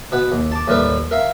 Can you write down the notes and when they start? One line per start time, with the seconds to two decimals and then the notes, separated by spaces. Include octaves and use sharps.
0.12 B2 B4 F#5
0.32 D#2
0.52 A5 D6
0.67 D#2 A2 G3 A#4 B4 E5
1.11 A#4 E5 F5